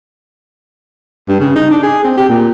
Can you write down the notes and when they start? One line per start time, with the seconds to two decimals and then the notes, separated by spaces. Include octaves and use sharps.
1.28 G2
1.40 C#3
1.56 D#4
1.71 D4
1.83 G#4
2.04 C4
2.17 G4
2.29 A#2